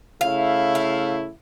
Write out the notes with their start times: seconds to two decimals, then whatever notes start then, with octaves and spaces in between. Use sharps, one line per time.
0.21 C#3 A3 E4 F5
0.75 F5